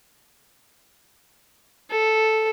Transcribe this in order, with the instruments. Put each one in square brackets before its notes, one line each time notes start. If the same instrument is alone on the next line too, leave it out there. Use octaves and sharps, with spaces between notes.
[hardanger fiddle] A4